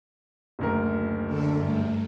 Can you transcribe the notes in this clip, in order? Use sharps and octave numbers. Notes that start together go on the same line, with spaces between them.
F#1 D2 A#4
D3 D4 A4
G2 A3